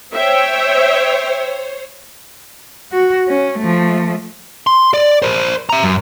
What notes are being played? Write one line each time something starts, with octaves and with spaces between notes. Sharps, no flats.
C5 C#5 E5 G5
F#4
C#4
F3 A3
C6
D5
A#4 C5
E5 A#5
F#2